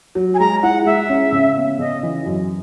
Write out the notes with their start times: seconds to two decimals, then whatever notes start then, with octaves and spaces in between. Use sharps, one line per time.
0.15 F#3
0.34 G#5
0.39 G#3 A#5
0.63 E4 F#5
0.86 G#3 E5
1.09 C#4
1.32 C#3
1.56 B3
1.79 C#3 D#5
2.03 E3
2.26 F#2